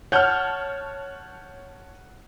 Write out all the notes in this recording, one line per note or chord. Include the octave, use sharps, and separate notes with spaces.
C#5 F#5 A5 F6 G6